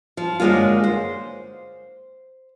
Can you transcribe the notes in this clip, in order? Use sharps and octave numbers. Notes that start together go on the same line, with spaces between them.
F3
F#2 D3 G#3 A#3 F4
C5